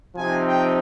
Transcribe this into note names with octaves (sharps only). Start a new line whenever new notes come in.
C3 F3 C4 D#4 G#5
G5